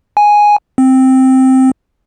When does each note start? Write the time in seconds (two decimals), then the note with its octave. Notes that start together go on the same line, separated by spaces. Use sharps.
0.17 G#5
0.78 C4